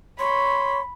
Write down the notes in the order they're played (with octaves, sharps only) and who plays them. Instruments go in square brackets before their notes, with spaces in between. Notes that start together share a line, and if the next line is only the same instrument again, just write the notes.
[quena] C#5 [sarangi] B5 [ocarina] C6